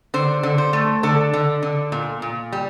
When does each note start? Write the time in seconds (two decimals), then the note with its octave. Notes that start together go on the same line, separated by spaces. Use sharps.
0.14 D3 C5
0.43 D3
0.58 C5
0.73 A3
1.03 D3 A4
1.34 D3
1.63 D3
1.92 A#2
2.22 A#2
2.52 G3